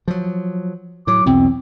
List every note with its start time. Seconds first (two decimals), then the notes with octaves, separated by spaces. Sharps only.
0.08 F3 F#3
1.07 A2 F#3 D6
1.26 B1 E2 B2 C4